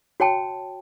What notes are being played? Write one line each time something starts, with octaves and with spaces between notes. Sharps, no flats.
F#4 C#5 G5 A5